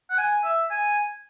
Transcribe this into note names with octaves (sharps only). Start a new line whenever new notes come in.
F#5
G#5
E5
G#5